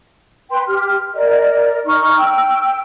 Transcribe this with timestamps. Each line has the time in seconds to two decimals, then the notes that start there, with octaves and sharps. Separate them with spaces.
0.50 B4 G5 C6
0.66 G4 F6
1.14 A#4 D5 D#5
1.85 D#4 C#6 F6
2.18 G5 E6